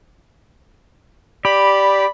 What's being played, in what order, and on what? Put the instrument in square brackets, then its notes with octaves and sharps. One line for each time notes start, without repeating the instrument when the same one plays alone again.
[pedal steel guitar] G4 [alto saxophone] D5 [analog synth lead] B5